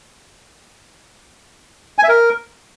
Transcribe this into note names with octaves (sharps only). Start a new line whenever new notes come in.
G#5
E5
A#4